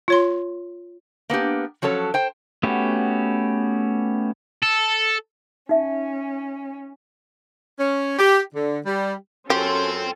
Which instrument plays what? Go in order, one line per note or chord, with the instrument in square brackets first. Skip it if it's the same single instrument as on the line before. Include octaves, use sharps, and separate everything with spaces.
[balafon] F4 C#5 C6
[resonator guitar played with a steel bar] A#3 B3 D4 G4
F3 F#3 C#4 A4 C#5
C5 G5
[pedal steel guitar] A3 B3 C#4 F#4 G4
[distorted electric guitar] A4
[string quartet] C#4 [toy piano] D#4 E5
[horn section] C#4
G4
D3
G3
[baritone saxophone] F#2 [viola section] C#4 F4 A4 [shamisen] G4 [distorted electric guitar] G5 C6